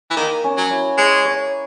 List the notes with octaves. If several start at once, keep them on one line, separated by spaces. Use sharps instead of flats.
E3
D#3 A#3
C#4
F#3
E4
G#3 C#5
C#5